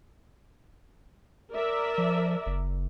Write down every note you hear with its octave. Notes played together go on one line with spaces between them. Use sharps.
A#4 D5 E5
F3
F#1